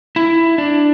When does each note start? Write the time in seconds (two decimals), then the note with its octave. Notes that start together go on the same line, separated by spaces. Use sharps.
0.16 E4
0.58 D4